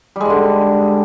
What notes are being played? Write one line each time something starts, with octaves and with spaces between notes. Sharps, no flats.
G#2 D3 G3 G#3